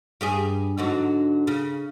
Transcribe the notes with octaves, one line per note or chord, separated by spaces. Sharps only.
G2 G4 G#4
G#2 D3 F#3
C#3